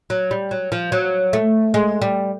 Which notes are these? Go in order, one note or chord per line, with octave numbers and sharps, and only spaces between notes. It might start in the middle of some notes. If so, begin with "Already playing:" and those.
F#3
G3
F#3
F3
F#3
A3
G#3
G3